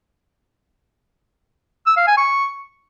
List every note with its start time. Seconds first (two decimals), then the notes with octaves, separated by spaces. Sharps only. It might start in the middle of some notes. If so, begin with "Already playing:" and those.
1.87 E6
1.97 F5
2.07 G#5
2.17 C#6